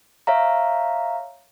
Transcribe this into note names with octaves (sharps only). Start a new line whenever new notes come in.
C#5 E5 F5 A#5